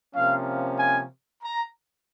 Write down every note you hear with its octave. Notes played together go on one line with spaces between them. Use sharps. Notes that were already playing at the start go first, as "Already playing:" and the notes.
C3 F3 A#3 C#4 F5
G#5
A#5